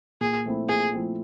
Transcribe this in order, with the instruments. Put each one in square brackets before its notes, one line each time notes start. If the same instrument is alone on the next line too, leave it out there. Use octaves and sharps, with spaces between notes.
[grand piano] A#2 [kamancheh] G#4
[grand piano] F3 A3 C4 E4
[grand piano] A#2 [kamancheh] G#4
[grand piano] F3 A3 C4 E4